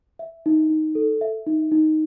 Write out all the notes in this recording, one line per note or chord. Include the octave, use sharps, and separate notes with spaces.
E5
D#4
D#4
A4
E5
D#4
D#4